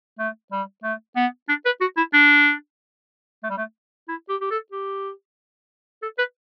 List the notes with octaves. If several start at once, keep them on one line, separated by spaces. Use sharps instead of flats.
A3
G3
A3
B3
D4
B4
F#4
E4
D4
A3
G3
A3
E4
G4
G4
A4
G4
A4
B4